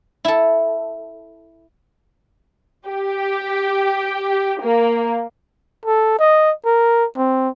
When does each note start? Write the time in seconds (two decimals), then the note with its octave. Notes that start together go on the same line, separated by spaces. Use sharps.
0.25 E4 A4
2.87 G4
4.61 A#3
5.86 A4
6.19 D#5
6.65 A#4
7.16 C4